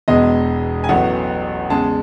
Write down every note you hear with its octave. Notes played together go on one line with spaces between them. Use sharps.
E1 E2 B2 G#3 D#5
G#5
A1 A2 F#3 B3 F#5
E2 C#3 G#3 A5